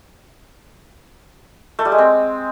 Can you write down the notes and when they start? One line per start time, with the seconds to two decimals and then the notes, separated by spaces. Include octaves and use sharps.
1.79 A3
1.85 G3
1.92 G#3
1.98 C4